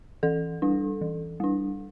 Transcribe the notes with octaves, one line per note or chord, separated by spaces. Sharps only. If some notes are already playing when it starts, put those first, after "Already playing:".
E3 A4
G3 D4
E3
G3 D4